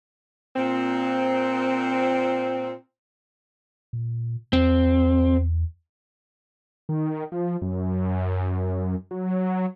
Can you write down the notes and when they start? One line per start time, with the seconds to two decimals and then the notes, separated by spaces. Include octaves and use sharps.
0.56 A#2 C4
3.93 A#2
4.53 E2 C4
6.89 D#3
7.32 F3
7.62 F#2
9.11 F#3